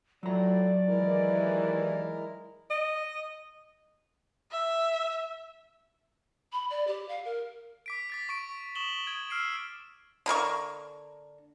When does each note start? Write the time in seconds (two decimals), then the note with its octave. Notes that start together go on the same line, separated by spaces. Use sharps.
0.23 A2 F#3 F4 D5 A#5
0.87 D#2 E3 G#3 E4 A#4
2.70 D#5
4.51 E5
6.52 B5
6.70 D5
6.87 G4
7.08 F5
7.25 A#4
7.86 D6 B6 D7
8.10 D6 A6 B6
8.29 C#6 D6 D7
8.75 C#6 D#6 E7 F#7 G7
9.06 D#6 G#6 D7
9.30 E6 F6 C7 D7
10.26 D3 A#3 A#4 C#6